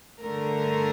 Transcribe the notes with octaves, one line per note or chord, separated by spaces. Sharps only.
G2 D3 A3 A#4